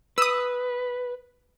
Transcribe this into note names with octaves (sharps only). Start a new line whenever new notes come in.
B4 D#6 E6